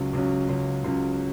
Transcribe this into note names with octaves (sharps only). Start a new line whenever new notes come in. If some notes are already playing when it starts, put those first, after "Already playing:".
Already playing: C#2 C#3 F#3
C#2 C#3 F#3
C#2 C#3 F#3
C#2 C#3 F#3